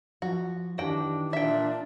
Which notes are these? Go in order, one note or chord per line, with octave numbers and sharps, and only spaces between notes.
F3 F#4
D#3 E3 D4 F#4 G4 G5
A#2 D4 E5 G5